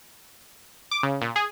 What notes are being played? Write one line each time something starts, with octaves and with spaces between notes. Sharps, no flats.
D6
C#3
A#2
G#4